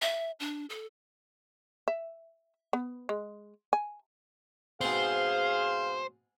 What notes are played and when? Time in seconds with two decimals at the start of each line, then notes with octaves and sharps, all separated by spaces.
0.02 E5
0.40 D4
0.70 A4
1.88 E5
2.73 B3
3.09 G#3
3.73 G#5
4.81 G#2 B2 C4 G#4 C5 F5